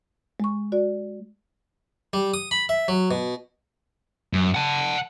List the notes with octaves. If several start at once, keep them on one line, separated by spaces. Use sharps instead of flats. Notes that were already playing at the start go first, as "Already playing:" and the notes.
G#3 C#6
F#4 D5
G3
D#6
B5
E5
F#3
B2
F#2
F#5 A5